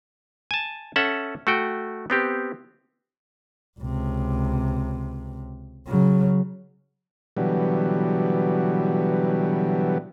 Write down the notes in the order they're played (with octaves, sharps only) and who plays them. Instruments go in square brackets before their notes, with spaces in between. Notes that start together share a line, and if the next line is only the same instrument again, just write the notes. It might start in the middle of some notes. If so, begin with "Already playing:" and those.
[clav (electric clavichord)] G#5 A5
C#4 A4 E5 F#5
A3 F#4 G5
B3 C4 G4
[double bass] C#2 C3
C#3 F#3
[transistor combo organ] B2 D3 E3 F#3 G3